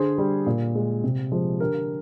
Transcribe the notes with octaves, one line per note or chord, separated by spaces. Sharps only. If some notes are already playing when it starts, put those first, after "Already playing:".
Already playing: D3 G#4 C5
G3
A#2
G#3
C3
F3 G#3
D3 G4 A#4